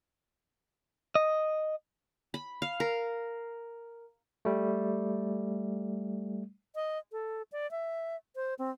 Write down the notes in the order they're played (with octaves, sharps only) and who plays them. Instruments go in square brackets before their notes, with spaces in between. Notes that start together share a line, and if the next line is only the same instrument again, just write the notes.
[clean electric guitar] D#5
[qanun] B5
F5
A#4
[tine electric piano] G3 A3
[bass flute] D#5
A4
D5
E5
C5
C4